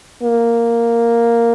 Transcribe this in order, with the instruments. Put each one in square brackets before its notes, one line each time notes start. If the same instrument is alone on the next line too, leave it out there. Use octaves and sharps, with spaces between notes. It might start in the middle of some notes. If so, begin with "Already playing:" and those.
[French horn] A#3